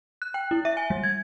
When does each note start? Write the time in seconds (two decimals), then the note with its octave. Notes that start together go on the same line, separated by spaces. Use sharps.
0.22 F#6
0.34 G5
0.51 E4
0.65 E5
0.77 G#5
0.90 G3
1.03 G#6